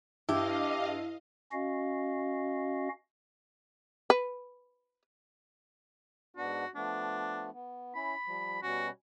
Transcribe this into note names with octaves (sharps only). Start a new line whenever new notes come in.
G2 E4 G4 D#5 F5
C#4 F#4 D#5 F5
B4
G#2 B3 D4 F#4
F3 A3 B3 D4
B3
C#4 E4 B5
F3 G3
B2 G3 C#4 F#4